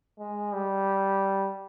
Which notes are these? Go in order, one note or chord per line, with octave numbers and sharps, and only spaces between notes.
G#3
G3